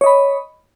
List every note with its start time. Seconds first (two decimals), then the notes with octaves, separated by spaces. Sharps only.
0.01 C#5
0.04 D#5
0.06 B5